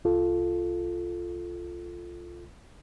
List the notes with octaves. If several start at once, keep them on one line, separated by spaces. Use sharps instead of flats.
C2 F4 A4